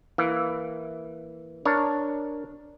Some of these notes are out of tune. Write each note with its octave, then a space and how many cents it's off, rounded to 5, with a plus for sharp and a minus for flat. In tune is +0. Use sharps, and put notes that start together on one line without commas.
E3 +0 A#3 +0
D4 +0 A#4 +0 C#5 +0